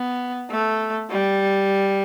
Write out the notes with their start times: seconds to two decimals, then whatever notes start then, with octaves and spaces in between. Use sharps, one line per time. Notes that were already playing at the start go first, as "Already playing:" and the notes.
Already playing: B3
0.51 A3
1.11 G3